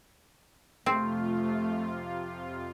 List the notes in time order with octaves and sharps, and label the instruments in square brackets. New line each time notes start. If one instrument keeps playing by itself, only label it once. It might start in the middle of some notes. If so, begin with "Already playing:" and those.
[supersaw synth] F2 C3 F4 [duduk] A3 [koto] C4